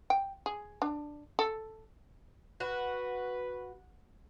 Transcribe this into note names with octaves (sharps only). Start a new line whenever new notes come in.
G5
G#4
D4
A4
F#4 B4